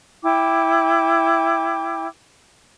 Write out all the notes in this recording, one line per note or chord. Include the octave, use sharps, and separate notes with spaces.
E4 G5 D6